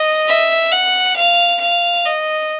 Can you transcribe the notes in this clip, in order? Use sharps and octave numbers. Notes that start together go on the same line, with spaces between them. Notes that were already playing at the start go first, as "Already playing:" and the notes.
Already playing: D#5
E5
F#5
F5
F5
D#5